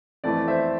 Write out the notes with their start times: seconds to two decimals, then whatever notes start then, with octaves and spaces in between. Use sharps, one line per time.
0.24 F2 E3 A3 D5
0.48 C5 E5